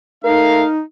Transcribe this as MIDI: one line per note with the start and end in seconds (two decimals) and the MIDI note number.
0.25 0.66 57
0.25 0.81 63
0.25 0.68 70
0.25 0.66 77